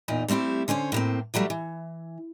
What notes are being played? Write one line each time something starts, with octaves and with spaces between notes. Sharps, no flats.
E2 A#2 D#4
G3 A3 C4 E4 G4
D3 C#4 C5 C#5
A2 A#3 C4
E3 F#3 G3 A3
E3